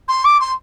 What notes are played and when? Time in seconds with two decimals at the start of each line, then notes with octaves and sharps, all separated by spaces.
0.08 C6
0.24 D6
0.40 C6